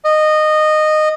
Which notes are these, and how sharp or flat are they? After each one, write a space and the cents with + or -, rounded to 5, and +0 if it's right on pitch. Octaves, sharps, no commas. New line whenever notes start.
D#5 -15